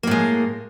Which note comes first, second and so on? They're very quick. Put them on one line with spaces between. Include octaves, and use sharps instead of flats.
A#3 A2 G#3